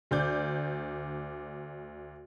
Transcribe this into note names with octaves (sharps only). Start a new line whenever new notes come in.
D2 D5 G6